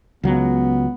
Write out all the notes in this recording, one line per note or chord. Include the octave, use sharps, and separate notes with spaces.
C#2 F#3 B3